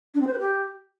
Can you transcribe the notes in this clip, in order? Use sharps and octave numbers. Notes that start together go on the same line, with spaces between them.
D4
C4
C5
B4
G4